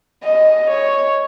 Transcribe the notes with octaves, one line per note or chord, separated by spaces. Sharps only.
D#5
C#5